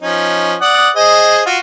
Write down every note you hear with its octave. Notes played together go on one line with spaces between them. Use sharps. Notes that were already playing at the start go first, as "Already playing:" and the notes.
F3 C#4 D#4
D5 F#5 D#6
G#4 C5 D#5
F4 F#4